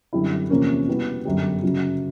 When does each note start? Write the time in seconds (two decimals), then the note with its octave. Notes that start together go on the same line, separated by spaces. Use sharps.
0.13 F#2 D3 G3 C4 E4
0.50 E2 C3 F3 A#3 C#4
0.88 B2 G3 B3 E4
1.25 G1 F#2 D3 G3
1.63 F#2 C#3 F#3